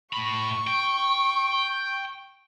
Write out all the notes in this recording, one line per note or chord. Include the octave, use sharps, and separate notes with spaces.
A2 B5 C#6
G5